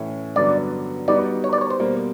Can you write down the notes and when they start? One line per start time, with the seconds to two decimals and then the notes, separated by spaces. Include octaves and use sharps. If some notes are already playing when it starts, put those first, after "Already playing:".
Already playing: A2 E3 A3 C#4
0.36 G2 D3 F#3 B3 D5
1.08 G3 B3 D#4 F#4 D5
1.44 C#5
1.53 D5
1.61 C#5
1.70 C5
1.79 B2 G3 A#3